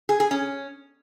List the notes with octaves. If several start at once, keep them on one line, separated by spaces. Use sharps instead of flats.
G#4
G#4
C#4